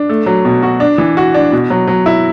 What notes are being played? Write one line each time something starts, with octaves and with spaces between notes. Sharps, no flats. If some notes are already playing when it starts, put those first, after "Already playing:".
Already playing: D4
A3
F#3
B2
F#4
D4
E3
F#4
D4
B2
F#3
F#3
E4